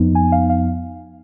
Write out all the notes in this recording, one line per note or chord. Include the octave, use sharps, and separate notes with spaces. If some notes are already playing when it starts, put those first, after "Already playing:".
Already playing: F2 F3 B3 D#4
G#5
F5
F5